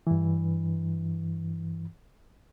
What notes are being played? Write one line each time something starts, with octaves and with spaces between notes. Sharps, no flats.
G2 E3